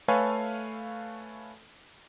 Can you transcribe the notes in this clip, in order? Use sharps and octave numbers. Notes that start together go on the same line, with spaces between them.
A3 A4 B4 C#5 F5 G#5